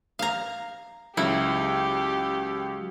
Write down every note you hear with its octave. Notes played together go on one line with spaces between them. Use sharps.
F5 A#5
C#2 F#3 E4 G4